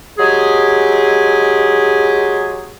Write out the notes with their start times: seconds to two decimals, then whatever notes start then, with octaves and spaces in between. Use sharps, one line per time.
0.19 F#3 G#3 G4 G#4